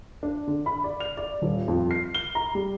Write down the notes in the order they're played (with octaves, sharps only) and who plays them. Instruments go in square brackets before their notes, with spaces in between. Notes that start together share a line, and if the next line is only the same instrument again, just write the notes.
[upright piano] D4
D3
B5
D5
F7
D5
D#1
F2
C7
G7
A#5
G3